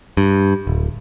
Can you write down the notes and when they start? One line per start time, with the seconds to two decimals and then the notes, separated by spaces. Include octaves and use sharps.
0.17 G2
0.67 D1